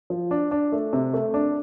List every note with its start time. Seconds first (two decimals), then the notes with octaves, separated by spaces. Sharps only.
0.10 F3
0.31 D4
0.51 D4
0.72 A3
0.93 C3
1.14 A3
1.34 D4